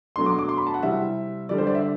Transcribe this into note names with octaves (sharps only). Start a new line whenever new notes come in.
B2 F#3 A3 D4 C6
D6
D6
C6
B5
A5
F#5
C3 G3 C4 E4 E5
D3 G3 D4 D5
C5
D5
E5